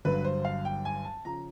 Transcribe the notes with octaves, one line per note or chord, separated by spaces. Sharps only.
G1 G2 D3 F#3 B4
C5
F5
G5
G#5
A5
C#3 F3 A#5